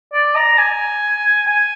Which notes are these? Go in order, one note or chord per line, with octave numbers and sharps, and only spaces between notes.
D5
A#5
G#5
G#5